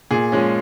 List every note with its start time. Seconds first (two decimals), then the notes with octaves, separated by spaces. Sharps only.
0.11 A#2 G#4
0.32 F3 G#3 C#4